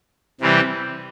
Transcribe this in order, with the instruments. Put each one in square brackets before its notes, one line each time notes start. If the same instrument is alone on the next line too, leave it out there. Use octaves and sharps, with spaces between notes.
[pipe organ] C3 E3 G3 C4